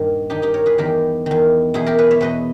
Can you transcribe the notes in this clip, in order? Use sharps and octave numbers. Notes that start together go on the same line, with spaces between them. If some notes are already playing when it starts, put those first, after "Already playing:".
Already playing: G2 A#2 D#3
G2 D#3 D#4 G4
D#4 G4
A#4 C#5
G#4 B4
E2 D#3 G4 A#4
E2 D#3
E2 B2 E4 G#4
G4 A#4
G#4 B4
C#5 E5
E2 B2 B4 D#5